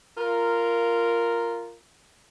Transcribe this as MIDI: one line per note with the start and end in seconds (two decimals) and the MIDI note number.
0.18 1.75 65
0.18 1.75 70